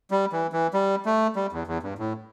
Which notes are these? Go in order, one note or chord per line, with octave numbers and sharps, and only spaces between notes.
G3
E3
E3
G3
A3
G3
E2
E2
G2
A2